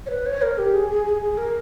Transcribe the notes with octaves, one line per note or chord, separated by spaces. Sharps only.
C#5
B4
C#5
A#4
G4
G#4
G#4
G#4
G#4
A#4